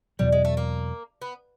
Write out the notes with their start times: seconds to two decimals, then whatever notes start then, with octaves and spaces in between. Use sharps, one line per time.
0.19 E2 B2 F#3 G3
0.32 G#3
0.45 A3
0.57 A#3
1.22 B3